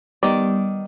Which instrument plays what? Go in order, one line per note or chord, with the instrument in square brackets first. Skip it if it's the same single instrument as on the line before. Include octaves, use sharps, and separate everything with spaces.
[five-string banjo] D#3 D5 [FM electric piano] G3 B3